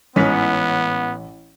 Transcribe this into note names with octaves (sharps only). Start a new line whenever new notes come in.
A1 G#2 B3 C#4 B6